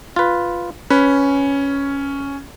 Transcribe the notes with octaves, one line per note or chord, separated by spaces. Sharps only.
F4 B4
C#4 B4